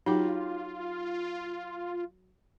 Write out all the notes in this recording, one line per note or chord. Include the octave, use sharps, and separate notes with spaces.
F#3 D#4 F4 G4